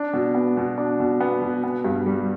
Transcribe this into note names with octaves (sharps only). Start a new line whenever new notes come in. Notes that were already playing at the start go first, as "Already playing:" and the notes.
Already playing: D4
B2
B3
B2
D4
B2
B3
B2
B3
G2
G3